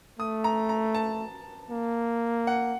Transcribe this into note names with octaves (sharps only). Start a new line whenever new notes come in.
A3 D#6
A#5
A#5
A5
A#3
F#5